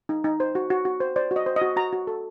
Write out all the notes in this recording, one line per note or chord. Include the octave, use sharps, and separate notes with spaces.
D#4
D#4
C5
F#4
F#4
F#4
C5
C5 D5
F#4
D#5
C5
D#5
F#4
F#4 A#5
F#4
A4